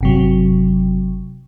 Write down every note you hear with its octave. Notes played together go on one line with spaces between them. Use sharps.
G1 C3 F#3